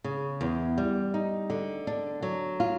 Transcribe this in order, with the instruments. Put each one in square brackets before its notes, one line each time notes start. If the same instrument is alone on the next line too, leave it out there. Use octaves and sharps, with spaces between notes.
[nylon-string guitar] C#3
E2
G3
D#4
D3
D4
F#3
F4